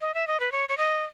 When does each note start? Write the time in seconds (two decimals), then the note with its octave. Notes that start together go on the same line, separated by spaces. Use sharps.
0.01 D#5
0.14 E5
0.27 D#5
0.40 B4
0.52 C#5
0.69 C#5
0.77 D#5